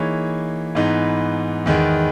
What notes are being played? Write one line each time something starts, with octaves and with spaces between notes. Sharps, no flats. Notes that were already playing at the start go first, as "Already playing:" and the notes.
Already playing: E3 A#3 D#4 G#4 C#5
G#2 E3 B3 D#4
E2 D#3 G#3 B3